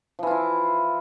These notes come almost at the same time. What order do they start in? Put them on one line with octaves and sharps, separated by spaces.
F3 E3 F4 E4